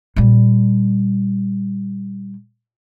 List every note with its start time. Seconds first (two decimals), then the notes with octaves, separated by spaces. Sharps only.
0.16 A#2 G3